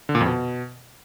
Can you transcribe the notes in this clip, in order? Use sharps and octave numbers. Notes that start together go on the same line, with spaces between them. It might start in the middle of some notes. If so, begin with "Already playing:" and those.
D3
A#2
F2
B2